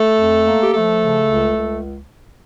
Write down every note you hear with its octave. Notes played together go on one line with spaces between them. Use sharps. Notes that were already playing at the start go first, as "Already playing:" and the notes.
Already playing: A3 A4
F2
A#3
G4
F3 A3 A4
C#3
C#2
C#2